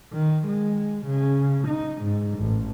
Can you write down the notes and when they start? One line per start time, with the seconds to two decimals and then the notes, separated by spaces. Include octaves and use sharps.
0.13 D#3
0.47 G#3
1.06 C#3
1.68 D#4
2.02 G#2
2.39 A1